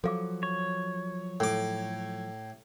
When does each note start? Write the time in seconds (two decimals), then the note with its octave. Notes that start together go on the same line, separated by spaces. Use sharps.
0.04 F3 F#3 A4 F5 D6
0.43 C#5
1.40 A2 A4 D6